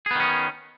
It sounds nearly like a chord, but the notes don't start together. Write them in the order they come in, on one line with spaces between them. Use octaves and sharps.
G#4 B3 D#3 C#4